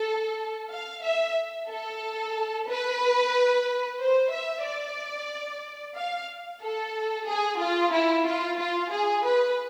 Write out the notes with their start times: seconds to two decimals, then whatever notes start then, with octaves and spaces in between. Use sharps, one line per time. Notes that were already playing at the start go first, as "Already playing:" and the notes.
Already playing: A4
0.71 F5
1.04 E5
1.70 A4
2.68 B4
3.99 C5
4.31 E5
4.64 D5
5.96 F5
6.61 A4
7.27 G#4
7.60 F4
7.92 E4
8.25 F4
8.58 F4
8.91 G#4
9.23 B4